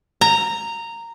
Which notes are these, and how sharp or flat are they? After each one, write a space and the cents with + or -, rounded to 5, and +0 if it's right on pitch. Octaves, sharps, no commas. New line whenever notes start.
A#5 -10